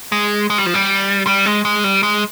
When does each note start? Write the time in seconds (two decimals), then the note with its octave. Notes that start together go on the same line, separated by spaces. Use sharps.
0.12 G#3
0.50 G#3
0.58 G3
0.66 F3
0.74 G3
1.27 G3
1.46 G#3
1.65 G#3
1.84 G3
2.03 G#3